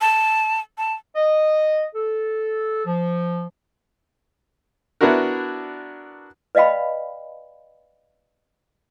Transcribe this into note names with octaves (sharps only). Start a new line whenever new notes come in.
A5
A5
D#5
A4
F3
B3 D4 E4 F#4 A#4
B4 D5 D#5 F5 G5 B5